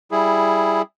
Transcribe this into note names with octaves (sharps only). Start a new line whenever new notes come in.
G3 E4 G#4